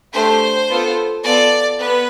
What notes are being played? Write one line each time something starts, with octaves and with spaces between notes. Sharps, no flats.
A3 D4 G4 C5
B3 F4 A4
B3 F4 A4 D5
B3 B4